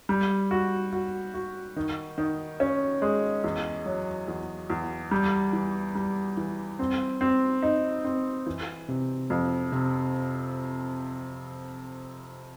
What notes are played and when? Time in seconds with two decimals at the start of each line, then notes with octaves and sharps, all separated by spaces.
0.09 G3
0.51 F#4
0.93 F#4
1.34 F#4
1.76 D#3
2.18 D#3
2.60 C#4
3.02 G#3
3.44 E2
3.86 F#3
4.28 E2
4.70 E2
5.11 G3
5.53 E3
5.95 G3
6.37 E3
6.79 C4
7.21 C4
7.62 D#4
8.05 C4
8.46 E3
8.88 C3
9.30 F2
9.72 C3